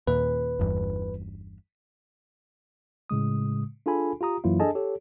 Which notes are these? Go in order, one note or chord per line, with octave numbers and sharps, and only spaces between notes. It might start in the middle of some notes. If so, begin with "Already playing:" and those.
D#2 A#2 B4
G1 E2 G2
A2 C#3 G#3 D#6
D4 F4 G#4 A4 G#5 B5
F4 G4 A#5 D#6
F#2 E3 F#3 A#3 E4 F4
D4 G#4 A4 D#5 G#5 A5
G4 A4 C#5